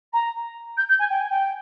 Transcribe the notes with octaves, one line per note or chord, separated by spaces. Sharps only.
A#5
G6
G6
G#5
G5
G#5
G5